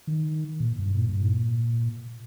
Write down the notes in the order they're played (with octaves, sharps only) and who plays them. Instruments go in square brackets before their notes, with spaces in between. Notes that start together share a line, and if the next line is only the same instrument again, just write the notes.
[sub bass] D#3
A#2
G2
A#2
G2
A#2